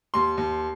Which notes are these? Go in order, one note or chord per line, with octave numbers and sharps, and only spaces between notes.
D#2 C6
D#2